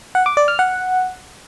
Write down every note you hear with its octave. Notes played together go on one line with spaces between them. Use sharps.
F#5
D6
D5
F6
F#5